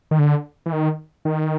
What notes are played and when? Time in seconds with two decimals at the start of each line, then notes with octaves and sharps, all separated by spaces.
0.11 D#3
0.19 D3
0.66 E3
0.72 D#3
1.25 D#3